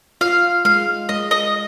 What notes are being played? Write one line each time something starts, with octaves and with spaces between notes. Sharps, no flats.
F4 F5
G#3 F5
G#3 D#5
D#5